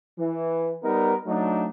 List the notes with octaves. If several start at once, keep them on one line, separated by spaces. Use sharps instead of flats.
E3
G3 B3 D#4 A#4
F#3 A3 D4 D#4